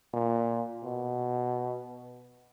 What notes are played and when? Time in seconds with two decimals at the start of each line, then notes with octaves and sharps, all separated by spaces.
0.13 A#2
0.84 B2